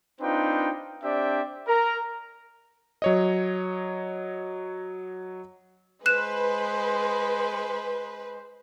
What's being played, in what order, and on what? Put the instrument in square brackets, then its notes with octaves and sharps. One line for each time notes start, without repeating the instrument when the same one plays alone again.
[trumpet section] C4 D4 D#4 F4 B4 G5
C4 D4 G4 D5 E5 G5
A#4 A#5
[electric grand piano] F#3 C#5 D#5
[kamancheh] G#3 C5 [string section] B4 [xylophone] F#6 E7